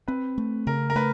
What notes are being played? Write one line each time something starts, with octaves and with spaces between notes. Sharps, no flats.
C4 B4
A3
C#3 A#4
A#4
A3 B4